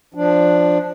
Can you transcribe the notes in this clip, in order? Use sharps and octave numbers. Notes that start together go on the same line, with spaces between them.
F3 D4